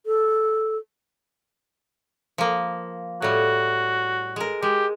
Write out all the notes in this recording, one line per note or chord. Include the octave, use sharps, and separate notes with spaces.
A4
F3 A#3
A2 G3 F#4
G#3 A#4
G#3 G4